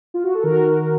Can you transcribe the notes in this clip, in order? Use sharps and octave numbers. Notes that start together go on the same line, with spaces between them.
F4
F#4
A4
D#3 F#4 A#4